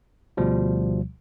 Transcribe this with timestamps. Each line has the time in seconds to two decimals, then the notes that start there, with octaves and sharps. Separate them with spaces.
0.37 D2 B2 F3 G3